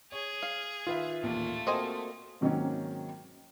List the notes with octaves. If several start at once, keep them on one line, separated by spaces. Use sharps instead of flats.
G#4 C#5
F5
D#3 F4 B4 E5
A1 D#2 A#2 A3
A#3 C4 F#4 A4 D#5 G#5
G#2 D#3 F#3 A#3 C4 C#4